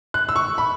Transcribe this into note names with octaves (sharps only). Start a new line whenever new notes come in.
F#6
E6
C#6
B5